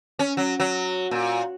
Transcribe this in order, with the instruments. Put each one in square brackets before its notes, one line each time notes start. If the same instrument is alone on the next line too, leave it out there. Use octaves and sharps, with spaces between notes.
[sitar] C#4
F#3
F#3
A#2